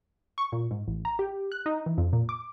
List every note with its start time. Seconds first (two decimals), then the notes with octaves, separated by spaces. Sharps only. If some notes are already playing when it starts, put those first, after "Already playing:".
0.38 C#6
0.52 A#2
0.71 G#2
0.88 A1
1.05 A#5
1.19 G4
1.52 F#6
1.66 D#4
1.86 E3
1.98 F2
2.13 A#2
2.29 D6